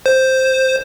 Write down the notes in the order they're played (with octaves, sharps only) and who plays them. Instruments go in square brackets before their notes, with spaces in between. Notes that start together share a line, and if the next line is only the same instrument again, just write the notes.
[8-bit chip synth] C5